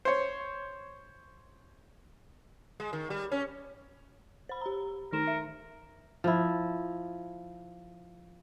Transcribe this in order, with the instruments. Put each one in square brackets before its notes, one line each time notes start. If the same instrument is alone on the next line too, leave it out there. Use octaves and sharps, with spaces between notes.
[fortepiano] C5 C#5
[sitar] G#3
D#3
G3
C#4
[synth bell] C5 B5
G4 A#5
[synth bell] D#3 D#4 E7 [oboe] A#4
[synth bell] E5
[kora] F3 E4